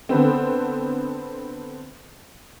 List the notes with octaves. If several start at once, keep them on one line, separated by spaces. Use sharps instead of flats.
D3 B3 C4